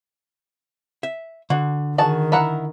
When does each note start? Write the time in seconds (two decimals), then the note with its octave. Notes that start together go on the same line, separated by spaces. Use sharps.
1.03 E5
1.50 D3 F#4
1.98 D#3 F#4 G#4 A5
2.32 E4 A#4 F#5